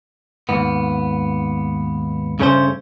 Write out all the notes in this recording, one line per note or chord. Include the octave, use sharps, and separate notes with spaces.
D#2 G#2 B3
G2 C#3 A3 C#4 G#4 C5